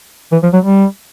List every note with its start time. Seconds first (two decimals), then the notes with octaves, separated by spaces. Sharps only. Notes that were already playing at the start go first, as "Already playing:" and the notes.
0.32 E3
0.43 F3
0.54 F#3
0.65 G3